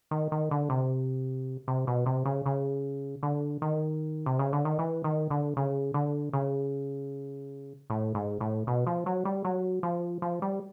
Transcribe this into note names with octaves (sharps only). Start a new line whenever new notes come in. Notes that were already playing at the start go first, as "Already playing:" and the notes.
D#3
D#3
D3
C3
C3
B2
C3
C#3
C#3
D3
D#3
C3
C#3
D3
D#3
E3
D#3
D3
C#3
D3
C#3
A2
G#2
A2
B2
F3
F#3
G3
F#3
F3
F3
G3